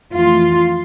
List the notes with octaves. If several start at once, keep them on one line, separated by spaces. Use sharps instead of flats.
F2 E3 A3 F4